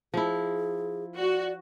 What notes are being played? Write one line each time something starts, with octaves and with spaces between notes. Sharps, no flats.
F3 E4 G#4
F#4 D5